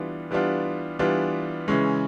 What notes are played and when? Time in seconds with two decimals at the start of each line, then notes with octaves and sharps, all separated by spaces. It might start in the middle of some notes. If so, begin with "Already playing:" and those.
Already playing: E3 G3 B3 D4 F4
0.31 E3 G3 B3 D4 F4
0.99 E3 G3 B3 D4 F4
1.68 C#3 E3 G#3 C#4